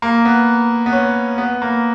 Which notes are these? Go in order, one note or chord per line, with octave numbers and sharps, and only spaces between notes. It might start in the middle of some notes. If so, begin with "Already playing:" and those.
A#3
B3
B3
C#4
B3
A#3